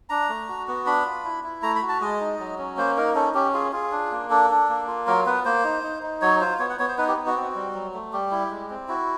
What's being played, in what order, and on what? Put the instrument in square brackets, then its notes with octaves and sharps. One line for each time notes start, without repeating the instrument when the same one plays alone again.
[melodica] D4 A#5
A3
F#4
B3
D4 B5
F4
E4
E4
A3 A#5
B5
F#4
A5
G#3 D#5
D#4
F#3
C#4
A#3 C5
D#4 A#4
C#4 A4
C#4 G4
F4 G#4
F4 G#4
D4
A#3
D4 A4
D4
A#3
F4
F#3 A#4
B3 B4
A#3 C5
D#4
D#4
D#4
F#3 C#5
F4 C5
B3 C#5
F#5
B3 C#5
C5
D#4 B4
G4
B3
F#4
C4
G3
F#3
A3
G3 G4
E4
G#3
C4
E4 F#4